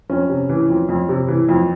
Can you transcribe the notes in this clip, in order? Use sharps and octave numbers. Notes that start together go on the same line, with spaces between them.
F2 C#4
C3
E3
F2
F2
C3
E3
F2